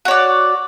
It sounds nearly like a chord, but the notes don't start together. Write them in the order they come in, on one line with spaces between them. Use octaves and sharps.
F#4 C#5 D5